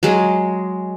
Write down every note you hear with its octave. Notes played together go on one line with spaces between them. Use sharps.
F#3 G#3